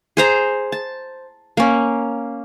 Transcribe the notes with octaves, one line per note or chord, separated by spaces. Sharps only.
G#4 C5 A#5
A5
A#3 C#4